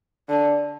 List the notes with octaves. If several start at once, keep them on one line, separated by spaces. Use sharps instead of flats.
D3